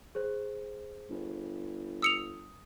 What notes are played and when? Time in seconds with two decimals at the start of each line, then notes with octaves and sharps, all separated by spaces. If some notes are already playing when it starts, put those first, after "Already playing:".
0.15 G#4 C5
1.10 G1
2.02 D#6 E6 C#7 F7